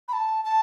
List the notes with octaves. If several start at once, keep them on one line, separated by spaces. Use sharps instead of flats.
B5
A5
A5